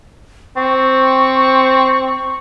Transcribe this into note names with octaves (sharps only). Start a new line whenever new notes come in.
C4 C#6